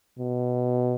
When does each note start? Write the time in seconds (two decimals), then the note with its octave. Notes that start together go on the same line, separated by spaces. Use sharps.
0.19 B2